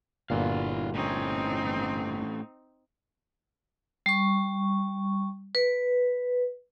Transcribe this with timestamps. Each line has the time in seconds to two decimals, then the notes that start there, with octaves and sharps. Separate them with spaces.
0.30 G1 A#2 E4 F#4 E5 F5
0.94 A2 C4 C#4 D#4
4.06 G3 C#6
5.55 B4